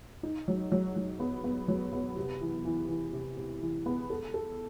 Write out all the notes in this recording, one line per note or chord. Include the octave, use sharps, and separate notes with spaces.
D#4
F#3
F#3
F#3
B3
B3
F#3
B3
C3
E3
E3
E3
C3
C3
E3
B3
A4
A4